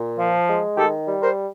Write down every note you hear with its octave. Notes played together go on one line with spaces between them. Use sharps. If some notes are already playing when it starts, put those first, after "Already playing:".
Already playing: A#2
F3
G#3
D#3 G4 A4
G3
A#4 C5